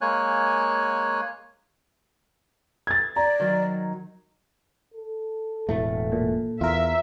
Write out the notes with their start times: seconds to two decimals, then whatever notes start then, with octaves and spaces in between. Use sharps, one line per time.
0.01 G#3 A#3 C#5 G#5 F#6
2.87 G#6 A6
3.16 D5 A#5
3.40 D#3 F#3
4.94 A4
5.69 E1 A2 A3
6.12 A#2
6.61 E2 F4 A#4 E5